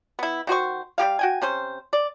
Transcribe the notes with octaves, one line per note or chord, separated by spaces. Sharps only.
B3 E4
D#3 F#4 C5 C#6
G3 A#3 G4 F5
F#4 G5 G#5
C3 C#4 C5
D5